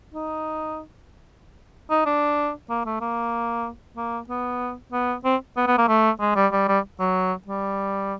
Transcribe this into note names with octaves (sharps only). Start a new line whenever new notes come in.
D#4
D#4
D4
A#3
A3
A#3
A#3
B3
B3
C4
B3
B3
A#3
A3
G#3
G3
G3
G3
F#3
G3